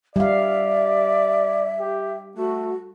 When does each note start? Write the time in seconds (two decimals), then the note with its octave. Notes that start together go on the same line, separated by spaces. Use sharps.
0.16 G3 D5 E5 F5
1.80 G4
2.37 A3 F#4